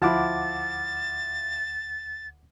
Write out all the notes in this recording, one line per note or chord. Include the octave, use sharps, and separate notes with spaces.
D2 F3 E4 F#5 D6 A6